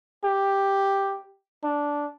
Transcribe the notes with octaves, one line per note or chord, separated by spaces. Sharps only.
G4
D4